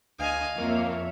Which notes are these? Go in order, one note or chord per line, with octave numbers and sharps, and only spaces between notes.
D2 D#5 F5 G#5
F2 A#3 F4 C#5 E5